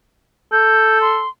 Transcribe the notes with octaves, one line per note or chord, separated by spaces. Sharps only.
A4 G6
C6